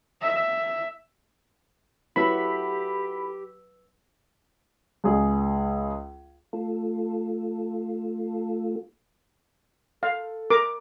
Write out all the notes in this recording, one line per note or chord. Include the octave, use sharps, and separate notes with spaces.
E5
F#3 E4 F#4 G4 A4 B4 B5 E6
C#2 G#4
A3 F4 A4
A4 F5
A#4 D6